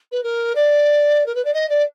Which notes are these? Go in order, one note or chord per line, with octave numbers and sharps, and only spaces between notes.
B4
A#4
D5
A#4
B4
D5
D#5
D5